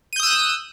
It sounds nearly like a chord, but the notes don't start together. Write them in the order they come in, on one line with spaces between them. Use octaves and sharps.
D#7 G6 D#6 E6 F#6